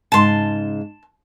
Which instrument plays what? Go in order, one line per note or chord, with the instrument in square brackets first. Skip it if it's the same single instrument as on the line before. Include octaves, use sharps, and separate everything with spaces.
[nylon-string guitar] G#2 C#3 [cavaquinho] A5 C6